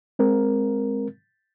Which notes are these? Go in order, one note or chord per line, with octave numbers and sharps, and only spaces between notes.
G#3 C4 A#4